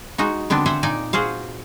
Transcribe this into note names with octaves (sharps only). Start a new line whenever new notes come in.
G#3 D#4 F#4
D3 B3 C4 D4
C5 E5 F#5 G#5
A#2 D#4 D5 G#5
F#4 G#4 C5 F5